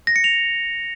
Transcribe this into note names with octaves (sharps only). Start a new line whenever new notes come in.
A#6
C#7
F7